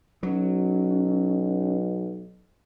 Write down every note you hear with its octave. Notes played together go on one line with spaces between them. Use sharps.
B1 F#3 C#4